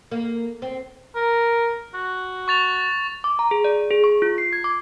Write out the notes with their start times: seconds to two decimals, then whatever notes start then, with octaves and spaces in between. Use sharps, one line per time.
0.11 A#3
0.62 C4
1.15 A#4
1.94 F#4
2.48 C#6 A6 F7
3.24 D6
3.39 A#5
3.51 G#4
3.64 D5
3.91 G#4
4.04 C#6
4.22 F4
4.38 C7
4.53 G#6
4.64 D6